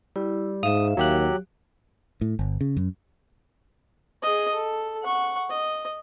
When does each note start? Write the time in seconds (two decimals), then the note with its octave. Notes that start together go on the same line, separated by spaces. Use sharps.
0.16 G3 E4
0.63 G#2 E5 F5 D#6
0.97 D#2 F#3 G4 F#6
2.21 A2
2.39 G1
2.61 C#3
2.77 F#2
4.23 G#4 D#5
4.54 A4
5.03 F#5 C#6
5.49 D#5